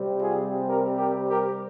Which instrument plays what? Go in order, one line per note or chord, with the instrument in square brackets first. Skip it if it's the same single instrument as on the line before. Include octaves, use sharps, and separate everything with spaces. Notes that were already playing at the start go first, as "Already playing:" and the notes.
Already playing: [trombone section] C3 G3 C4
F4 G#4
G4 A#4
G4 A#4
G4 A#4